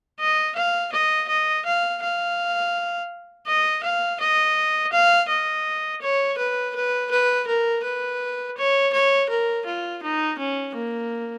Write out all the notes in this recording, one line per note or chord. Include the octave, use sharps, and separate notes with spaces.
D#5
F5
D#5
D#5
F5
F5
D#5
F5
D#5
F5
D#5
C#5
B4
B4
B4
A#4
B4
C#5
C#5
A#4
F4
D#4
C#4
A#3